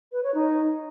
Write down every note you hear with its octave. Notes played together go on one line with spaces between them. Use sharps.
B4
C#5
D#4